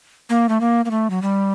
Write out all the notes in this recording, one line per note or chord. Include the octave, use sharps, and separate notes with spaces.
A#3
A3
A#3
A#3
A3
F#3
G3